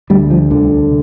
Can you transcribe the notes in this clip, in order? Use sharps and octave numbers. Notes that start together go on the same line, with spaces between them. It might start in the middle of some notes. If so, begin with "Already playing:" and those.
D2 G3
F3
C2 D3